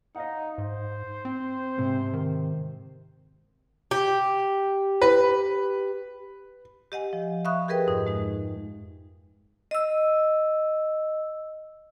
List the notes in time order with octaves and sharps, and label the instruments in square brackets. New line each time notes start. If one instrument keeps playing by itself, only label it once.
[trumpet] D#4 [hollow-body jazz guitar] D#5 F5 F#5
[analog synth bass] G#2 [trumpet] C5
[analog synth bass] C4
[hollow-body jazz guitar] G#2 C3
[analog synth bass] D#3
[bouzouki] G4
[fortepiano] B4
[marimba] G4 D#5 F#5 G#5
F3
E5 F5 B5 C#6 D#6 F#6
G4 G#4 A#4 B4 D#5 G5
F2 G#2 D#4
G#3 D#4
[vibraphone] D#5 E6